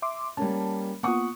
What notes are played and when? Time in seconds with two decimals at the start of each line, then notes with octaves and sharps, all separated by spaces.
0.02 E5 C6 D6
0.37 G3 A#3 C#4 A5
1.03 A#3 B3 F4 F#5 C#6 D#6